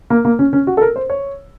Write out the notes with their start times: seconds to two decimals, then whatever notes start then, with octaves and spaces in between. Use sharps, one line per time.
0.10 A#3
0.25 A#3
0.39 C#4
0.53 C#4
0.67 F#4
0.77 A4
0.81 A#4
0.96 C5
1.10 C#5